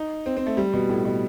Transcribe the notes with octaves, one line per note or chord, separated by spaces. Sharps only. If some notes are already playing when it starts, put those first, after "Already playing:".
Already playing: D#4
C4
C4
A3
G3
B2
A2
B2